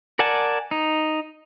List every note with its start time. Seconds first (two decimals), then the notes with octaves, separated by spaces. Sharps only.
0.19 A#4 D5 F#5 G#5 A5
0.71 D#4